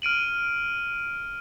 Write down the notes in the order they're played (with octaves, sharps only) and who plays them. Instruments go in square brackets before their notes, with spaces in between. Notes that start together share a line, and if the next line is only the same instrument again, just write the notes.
[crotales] F6 D7 D#7 F#7